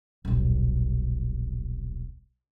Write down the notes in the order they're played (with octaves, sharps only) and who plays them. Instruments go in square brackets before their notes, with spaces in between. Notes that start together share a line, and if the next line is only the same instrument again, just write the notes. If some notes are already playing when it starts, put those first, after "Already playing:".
[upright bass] D#1 B1